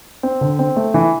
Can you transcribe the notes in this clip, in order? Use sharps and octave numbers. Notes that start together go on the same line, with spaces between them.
C4
D3
C4
A3
E3